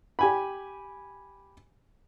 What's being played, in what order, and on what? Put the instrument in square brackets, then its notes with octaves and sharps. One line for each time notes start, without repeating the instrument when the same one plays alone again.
[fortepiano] G4 G#5 B5